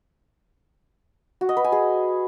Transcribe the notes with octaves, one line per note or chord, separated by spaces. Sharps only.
F#4
D#5
B4
G#5
G#4